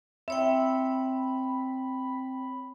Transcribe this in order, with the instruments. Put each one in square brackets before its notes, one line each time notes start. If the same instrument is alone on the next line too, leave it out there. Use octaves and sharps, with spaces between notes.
[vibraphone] C4 C#5 G5 [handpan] E5 [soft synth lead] B5